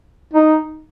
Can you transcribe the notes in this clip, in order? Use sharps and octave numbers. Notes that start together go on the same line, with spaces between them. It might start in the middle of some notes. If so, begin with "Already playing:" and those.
D#4